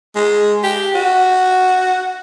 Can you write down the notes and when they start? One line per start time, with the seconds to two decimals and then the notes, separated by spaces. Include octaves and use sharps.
0.16 G#3
0.64 G4
0.95 F#4